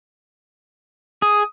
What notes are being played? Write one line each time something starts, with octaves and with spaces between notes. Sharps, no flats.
G#4 D#6